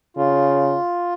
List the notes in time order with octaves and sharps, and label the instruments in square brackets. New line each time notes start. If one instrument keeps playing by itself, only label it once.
[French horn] C#3 [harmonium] F4